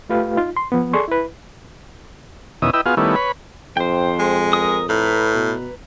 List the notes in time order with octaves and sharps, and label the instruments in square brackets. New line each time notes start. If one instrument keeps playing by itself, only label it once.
[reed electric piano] A3 F4 G4 B4 F5
D#4 F4
C6
F3 B3
G#4 A4 D5 C6 C#6
E4 B4
[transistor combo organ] E2 B2 D#3 C#4 E5 D#6
E4 B4 D#5 G5 E6
B3 F4 F#4 G#4 F5
D#3 G3 A3 B3 C#4 E4
B4 C#5 B5
[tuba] F2 [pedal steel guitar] C5 G5
[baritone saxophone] G#3
[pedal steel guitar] A#4 D#6
[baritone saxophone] A2 [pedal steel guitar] B4 A#5
[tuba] B2